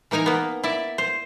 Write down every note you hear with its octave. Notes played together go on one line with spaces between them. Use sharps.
E3 A#3 D#4 G#5 A#5
A#3 B3
E4 D5 E5
C5